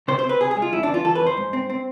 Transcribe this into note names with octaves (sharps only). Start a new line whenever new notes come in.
C3 C5
C5
C4
B4
C3 G#4
G#4
G#3
F4
F2 E4
D4
E3
F4
E3 A4
B4
F2
C5
G#2
C4
C4